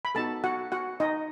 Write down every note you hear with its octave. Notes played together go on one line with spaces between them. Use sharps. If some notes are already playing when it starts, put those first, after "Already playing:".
B5
B3 D#4 F#4 A4 A5
F#4 F#5
F#4 F#5
D#4 D#5